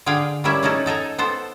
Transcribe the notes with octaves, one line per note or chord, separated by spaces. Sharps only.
D3 G#4 F5 G5
G3 A#3 C#4 E4 E5
A3 C#4 D#4 E4 A4
D#4 A4 G#5 A#5
B3 A4 C5